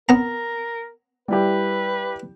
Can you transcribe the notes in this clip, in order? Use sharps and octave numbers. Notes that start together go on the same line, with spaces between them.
B3 A#4 A#5
G3 E4 G4 B4